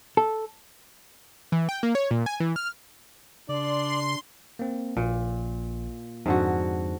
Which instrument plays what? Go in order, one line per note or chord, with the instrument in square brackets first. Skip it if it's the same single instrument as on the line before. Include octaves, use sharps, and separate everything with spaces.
[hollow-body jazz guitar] A4
[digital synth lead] E3
G5
A#3
C#5
A#2
G#5
E3
F6
[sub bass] C#3 [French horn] D4 [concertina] D5 [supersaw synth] C6
[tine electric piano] A#3 C4
[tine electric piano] A#1 [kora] A#2
[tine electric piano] F2 [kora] G#2 D3 F#4